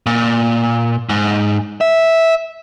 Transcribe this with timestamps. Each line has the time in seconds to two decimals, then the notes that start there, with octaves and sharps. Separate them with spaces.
0.06 A#2
1.09 G#2
1.81 E5